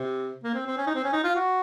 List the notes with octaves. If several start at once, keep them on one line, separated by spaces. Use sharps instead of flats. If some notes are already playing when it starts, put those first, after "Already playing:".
Already playing: C3
A#3
C4
C4
C#4
D#4
C4
C#4
D#4
F4
F#4